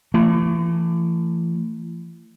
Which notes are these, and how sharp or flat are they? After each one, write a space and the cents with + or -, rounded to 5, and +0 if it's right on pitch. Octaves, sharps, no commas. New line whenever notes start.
E3 +40 A3 +35